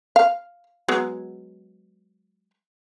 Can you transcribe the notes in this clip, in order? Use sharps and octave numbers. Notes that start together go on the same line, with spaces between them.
F5
F#3 G#3 B3